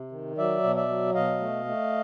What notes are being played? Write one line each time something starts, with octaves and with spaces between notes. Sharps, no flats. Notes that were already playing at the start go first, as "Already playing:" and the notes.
Already playing: C3
D#3
F#3 D5 E5
B2
D5 E5
F#3
B2 D#5 F5
A3
A3